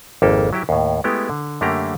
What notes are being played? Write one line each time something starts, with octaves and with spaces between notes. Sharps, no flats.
G#1 F2 A#3 G4 A4
F#3 E4 G4
D#2 A2
G#3 A3 B3 E4 G4
D3
F#2 D3 A3 A#3 G4 A#5